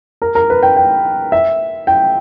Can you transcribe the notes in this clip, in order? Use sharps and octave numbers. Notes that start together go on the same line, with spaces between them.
A#4
A#4
B4
G5
G5
E5
G5